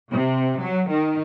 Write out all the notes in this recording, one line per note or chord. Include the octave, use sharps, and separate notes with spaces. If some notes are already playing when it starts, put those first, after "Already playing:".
C3
F#3
D#3